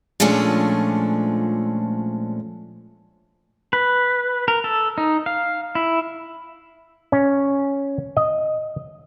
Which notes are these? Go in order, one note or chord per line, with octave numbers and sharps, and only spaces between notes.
A#2 F3 G#3 A3 C#4 D4
B4
A#4
A4
D#4
F5
E4
C#4
D#5